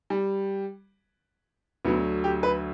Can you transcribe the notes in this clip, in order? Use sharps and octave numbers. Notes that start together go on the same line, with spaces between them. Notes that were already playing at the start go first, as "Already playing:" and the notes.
G3
D2 D3 F#3 B3
G4
B4